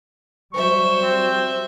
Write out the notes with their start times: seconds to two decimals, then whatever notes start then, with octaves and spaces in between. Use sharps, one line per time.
0.54 F#3 G3 C5 E5 C#6
1.03 C4